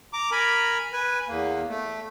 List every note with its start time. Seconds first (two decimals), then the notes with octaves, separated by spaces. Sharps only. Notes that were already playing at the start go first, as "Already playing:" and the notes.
0.13 A#5 D6
0.31 A#4 G#5 A#5 B5
0.93 B4 G#5
1.28 E2 A#3
1.69 A3